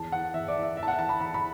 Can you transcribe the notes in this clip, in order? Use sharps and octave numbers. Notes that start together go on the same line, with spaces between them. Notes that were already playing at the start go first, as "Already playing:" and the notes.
Already playing: E2 A5
E3 F#5
E2 E5
D5
E3
E5
E2 E5
A5
F#5
E3 A5
B5
E2 B5
B5